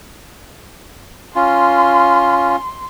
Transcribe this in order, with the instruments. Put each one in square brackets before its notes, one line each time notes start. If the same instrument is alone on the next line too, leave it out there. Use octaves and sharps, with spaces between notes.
[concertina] C#4 F4 [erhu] C6